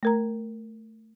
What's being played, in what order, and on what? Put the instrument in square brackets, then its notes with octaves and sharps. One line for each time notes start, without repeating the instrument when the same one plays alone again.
[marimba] A3 A#4 A#5